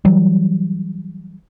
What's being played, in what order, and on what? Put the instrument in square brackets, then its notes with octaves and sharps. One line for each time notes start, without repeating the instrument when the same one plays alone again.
[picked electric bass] E3 F#3 G3